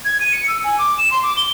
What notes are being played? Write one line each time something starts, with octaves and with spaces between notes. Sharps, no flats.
G#6
D#7
C#7
E6
G#5
D6
E7
C6
D6
G7